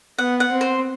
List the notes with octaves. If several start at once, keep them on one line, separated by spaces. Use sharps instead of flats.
B3 F#5
F#5
C4
C5